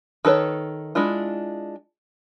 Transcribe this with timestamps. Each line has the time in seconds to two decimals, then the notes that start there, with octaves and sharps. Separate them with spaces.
0.25 D#3 A4 B4 C#5
0.95 G#3 D4 E4 F4